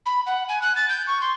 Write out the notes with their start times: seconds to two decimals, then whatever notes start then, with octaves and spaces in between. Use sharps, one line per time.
0.06 B5
0.26 F#5
0.49 G#5
0.62 F#6
0.76 A6
0.89 G6
1.07 C#6
1.21 C6